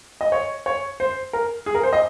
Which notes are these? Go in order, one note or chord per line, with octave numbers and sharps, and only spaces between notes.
D#5
C#5
C#5
C5
A#4
G#4
A#4
C5
D#5